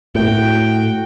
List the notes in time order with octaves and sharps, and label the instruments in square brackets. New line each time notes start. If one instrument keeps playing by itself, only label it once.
[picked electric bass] A2 [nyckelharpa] F#4 G5